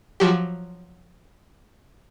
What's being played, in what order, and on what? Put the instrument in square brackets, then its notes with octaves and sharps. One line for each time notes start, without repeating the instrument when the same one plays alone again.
[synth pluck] F3 F#3 G4